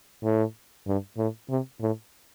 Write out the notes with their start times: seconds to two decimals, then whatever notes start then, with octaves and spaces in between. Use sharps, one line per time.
0.24 A2
0.87 G2
1.17 A2
1.49 C3
1.80 A2